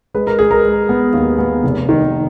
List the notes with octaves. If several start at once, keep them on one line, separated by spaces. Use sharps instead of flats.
G#3 B4
A#4
G#3 G#4
A#4
G#3
B3
D#2
B3
F1
D#3